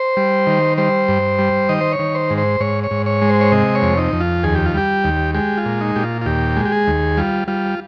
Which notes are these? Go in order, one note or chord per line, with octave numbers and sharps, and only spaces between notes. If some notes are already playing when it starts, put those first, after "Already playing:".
Already playing: C5
G3
D#3
G3 C5
G2
G3
D#3 D#5
C5
C#5
D#3
C5
G#2
C5
G#2 C#5
C#5
G#2
C#5
G#3
C5
C#5
C3 D#5
C#5
F2
D#4
F2
F4
D#2 G#4
G4
F4
G3 G4
D#2
G#3 G4
F4
A#2
D#4
A#2 G4
F4
F4
D#2 G4
G#3
G4
G#4
D#2
G3 F4
G3 F4